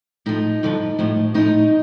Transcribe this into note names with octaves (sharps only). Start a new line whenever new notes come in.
A2 F3 D#4
G2 D3 F3
A2 F3
A2 F3 D#4